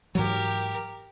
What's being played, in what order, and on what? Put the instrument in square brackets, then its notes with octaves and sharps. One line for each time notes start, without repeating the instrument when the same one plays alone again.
[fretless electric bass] G#2 E3 F#3 [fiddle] G4 A#4